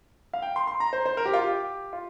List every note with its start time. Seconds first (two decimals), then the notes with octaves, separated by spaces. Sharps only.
0.33 F5
0.42 G5
0.56 C6
0.67 C6
0.80 A#5
0.93 C5
1.06 C5
1.17 A#4
1.25 G4
1.33 F4
1.41 G4
1.93 F4